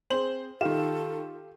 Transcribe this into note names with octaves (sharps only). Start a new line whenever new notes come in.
C4 G#4 C5 F#7
D#3 F4 G4 A4 F5 E7